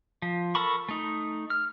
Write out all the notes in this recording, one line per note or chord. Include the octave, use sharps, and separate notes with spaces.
F3
A4 A#4 A5 B5 C#6
A3 D#4
F6